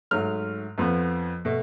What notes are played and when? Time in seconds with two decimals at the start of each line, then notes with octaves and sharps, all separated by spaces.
0.11 G#2 F#3 A3 F6
0.78 F2 F3 B3
1.45 B2 A3